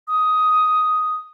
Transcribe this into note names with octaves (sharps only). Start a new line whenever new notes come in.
D#6